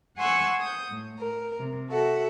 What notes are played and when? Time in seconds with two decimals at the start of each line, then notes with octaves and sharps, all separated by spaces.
0.17 F#5 G#5 C6 C#6 E6 F#6
0.60 D#6 G6
0.89 A2
1.19 A#4
1.59 C3
1.89 F#4 A4 E5 F#5